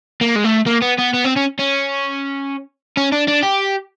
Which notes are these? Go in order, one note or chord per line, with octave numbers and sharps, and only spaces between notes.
A#3
G#3
A3
A#3
B3
B3
B3
C4
C#4
C#4
C#4
D4
D4
G4